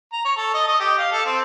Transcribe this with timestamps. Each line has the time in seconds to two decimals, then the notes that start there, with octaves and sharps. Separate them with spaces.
0.13 A#5
0.25 C#5
0.37 A4
0.54 D#5
0.68 D#5
0.80 G4
0.98 F5
1.12 A4
1.26 C4